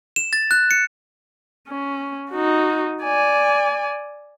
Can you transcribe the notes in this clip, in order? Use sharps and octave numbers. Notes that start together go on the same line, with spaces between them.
E7
A6
F#6
C#7
C#4
D#4 F#4
D5 G#5